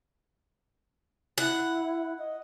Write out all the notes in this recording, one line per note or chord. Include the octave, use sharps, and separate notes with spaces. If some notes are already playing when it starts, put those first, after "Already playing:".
E4 F#5
D#5